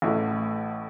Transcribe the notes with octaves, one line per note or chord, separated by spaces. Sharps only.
A1 A2 A3